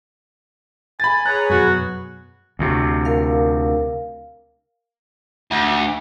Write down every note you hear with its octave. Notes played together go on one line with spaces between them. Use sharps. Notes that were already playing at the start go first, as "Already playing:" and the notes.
G#5 B5 A6
G#4 B4 C#5 A#5 F#6
F#2 B2 F#4
D2 C3
A#4 F5
D2